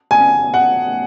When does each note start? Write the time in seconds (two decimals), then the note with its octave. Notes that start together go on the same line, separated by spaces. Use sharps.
0.11 G#5
0.54 F#5